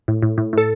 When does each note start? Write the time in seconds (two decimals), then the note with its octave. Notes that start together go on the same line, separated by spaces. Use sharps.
0.08 A2
0.22 A2
0.38 A2
0.53 A2 A4